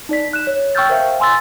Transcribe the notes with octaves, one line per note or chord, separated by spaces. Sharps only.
D#4 D5 B6
F#6 E7
C#5
G5 C#6 E6 F6 G6 A6
A#4 C5 E5 F5 G5
G#5 C6 E6 A6